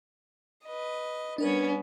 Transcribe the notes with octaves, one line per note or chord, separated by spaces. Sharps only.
B4 D#5
G3 B3 C#4 D4 A#4 B4